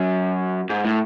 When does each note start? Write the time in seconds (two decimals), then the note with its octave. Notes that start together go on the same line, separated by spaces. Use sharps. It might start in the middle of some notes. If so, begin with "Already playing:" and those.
Already playing: F#2
0.70 G#2
0.85 A2